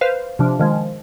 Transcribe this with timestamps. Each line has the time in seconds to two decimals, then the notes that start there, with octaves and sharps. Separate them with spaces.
0.01 B4 C5 F5
0.39 C3 F3 D4
0.59 D#3 F3 G#3